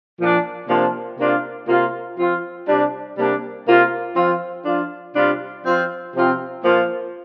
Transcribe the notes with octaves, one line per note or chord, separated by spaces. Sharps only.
A#2 F3 D4
C3 F3 A#3 D4 F4
C3 A#3 D4 F4
C3 A#3 F4
F3 C4 F4
C3 G3 D4
C3 G3 A#3 D4
C3 A#3 F4
F3 C4 F4
F3 D4 F4
C3 G3 D4 F4
F3 C4 F4
C3 F3 C4 F4
A#2 F3 A#3 F4